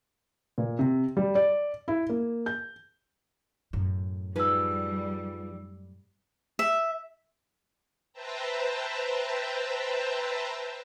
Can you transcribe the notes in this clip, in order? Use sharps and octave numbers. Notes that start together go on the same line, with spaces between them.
A#2
C3
G3
D5
E4
A#3
G6
F#2 A2
F3 G3 D#4 G#4 B4 E6
E5
B4 C5 E5 G5 A5 A#5